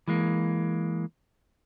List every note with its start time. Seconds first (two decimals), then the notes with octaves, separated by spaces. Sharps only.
0.08 E3 G#3 A#3